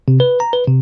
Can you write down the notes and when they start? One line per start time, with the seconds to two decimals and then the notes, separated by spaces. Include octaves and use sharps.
0.08 C3
0.20 B4
0.40 A#5
0.53 B4
0.67 C3